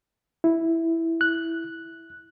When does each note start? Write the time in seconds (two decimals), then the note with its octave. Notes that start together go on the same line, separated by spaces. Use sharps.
0.44 E4
1.21 F#6